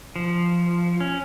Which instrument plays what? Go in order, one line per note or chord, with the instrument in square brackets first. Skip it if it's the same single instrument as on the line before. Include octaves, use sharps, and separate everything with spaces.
[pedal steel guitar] F3
C#4